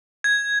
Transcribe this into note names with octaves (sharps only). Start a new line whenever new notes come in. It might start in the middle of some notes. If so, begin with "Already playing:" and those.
G#6